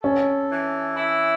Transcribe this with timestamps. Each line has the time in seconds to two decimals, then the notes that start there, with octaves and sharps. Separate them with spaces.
0.03 C#4 A4
0.51 E3
0.97 E4